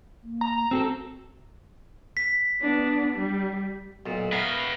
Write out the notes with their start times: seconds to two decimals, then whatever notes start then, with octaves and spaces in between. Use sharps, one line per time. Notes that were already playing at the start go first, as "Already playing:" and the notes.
0.23 A#3
0.41 A#5
0.71 C4 F#4 G#4 A4
2.17 B6
2.62 B3 D4
3.15 G3
4.06 B1 A#2
4.32 B3 A#4 B4 E5 F5